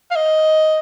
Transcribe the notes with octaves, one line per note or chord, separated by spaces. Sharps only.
F5
D#5